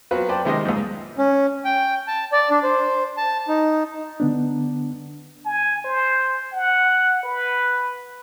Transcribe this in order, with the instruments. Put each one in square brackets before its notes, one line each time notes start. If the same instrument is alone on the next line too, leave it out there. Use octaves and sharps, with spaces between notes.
[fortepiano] F#3 B3 C4 F4 F#4 B4
B4 C5 D5 G5 A5
C3 D#3 G#3 C5 D#5
C#2 G#2
[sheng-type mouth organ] C#4
G5
A5
D5
D4
C5
A5
D#4
[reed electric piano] D3 B3 D4
[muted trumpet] G#5
C5
F#5
B4